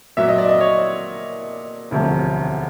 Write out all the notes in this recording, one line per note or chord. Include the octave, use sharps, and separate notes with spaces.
A#2 F#3 A#3 E5
D#5
D5
D#5
C#5
E1 D2 C3 F3